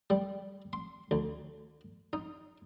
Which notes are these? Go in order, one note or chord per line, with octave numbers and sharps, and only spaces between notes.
G3
C6
D2
D#4